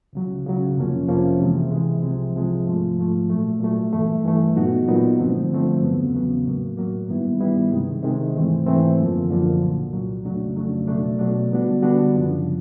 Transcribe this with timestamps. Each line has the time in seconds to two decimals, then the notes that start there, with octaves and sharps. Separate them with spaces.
0.13 C#2 C#3 F#3
0.45 C#2 C#3 F#3
0.76 F2 C3 F3 A#3 C#4
1.08 F2 C3 F3 A#3 C#4
1.40 C3 E3 G#3
1.71 C3 E3 G#3
2.03 C2 C3 F3 G#3
2.34 C2 C3 F3 G#3
2.66 G#2 F3 A3
2.98 G#2 F3 A3
3.30 A#2 F#3 A3
3.60 A#2 F#3 A3
3.93 G2 E3 A3
4.24 G2 E3 A3
4.55 A#2 F#3 B3 D#4 F#4
4.88 A#2 F#3 B3 D#4 F#4
5.19 G2 D3 F3 A3 C4
5.51 G2 D3 F3 A3 C4
5.82 E2 C#3 F#3 B3
6.14 E2 C#3 F#3 B3
6.45 A2 F#3 A#3
6.77 A2 F#3 A#3
7.08 G2 D#3 G3 B3 E4
7.40 G2 D#3 G3 B3 E4
7.71 C3 D#3 G#3
8.03 C3 D#3 G#3
8.35 G#2 E3 A3 C4
8.67 G#2 E3 A3 C4
8.99 F#2 D3 F3 A#3
9.29 F#2 D3 F3 A#3
9.62 C2 A#2 F#3
9.93 C2 A#2 F#3
10.25 F2 C#3 F#3 A3 D4
10.56 F2 C#3 F#3 A3 D4
10.87 B2 F#3 A3 D4
11.19 B2 F#3 A3 D4
11.51 D3 G3 B3 D4 F#4
11.82 D3 G3 B3 D4 F#4
12.14 F#2 C#3 F3